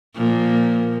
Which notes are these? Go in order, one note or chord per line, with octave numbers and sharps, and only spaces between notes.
A#2 F3 A#3